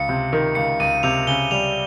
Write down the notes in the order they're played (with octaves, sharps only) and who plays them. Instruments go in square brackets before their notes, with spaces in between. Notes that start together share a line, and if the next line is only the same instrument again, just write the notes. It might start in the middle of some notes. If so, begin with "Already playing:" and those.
Already playing: [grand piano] C#2 [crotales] C#7
[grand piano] C3
D#3
[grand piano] C#2 [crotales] C#7
[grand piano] C#2 [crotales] D#7
[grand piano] C3 [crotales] F7
[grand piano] C#3 [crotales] G7
[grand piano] G3 [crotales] F7